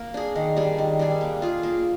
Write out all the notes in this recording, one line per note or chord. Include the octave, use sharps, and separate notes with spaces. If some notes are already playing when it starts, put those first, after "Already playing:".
Already playing: A#3
D4 G#4
D#3
G3 D4 G#4
D#3
G3 D4 G#4
A#3
F4 G#4
A#3